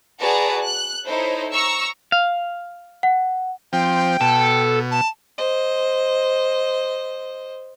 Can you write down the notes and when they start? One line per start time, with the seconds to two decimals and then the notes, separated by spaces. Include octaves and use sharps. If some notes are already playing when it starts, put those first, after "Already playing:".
0.20 F#4 G#4 B4 D5 A5 A#5
0.64 F#6
1.06 D#4 E4 A4 C5 C#5
1.53 A#5 C#6 E6
2.12 F5
3.03 F#5
3.73 F3 C4 G5
4.21 B2 A4
4.91 A5
5.38 C5 D#5